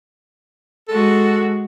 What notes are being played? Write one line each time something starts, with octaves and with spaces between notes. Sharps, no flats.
G#3 F#4 A4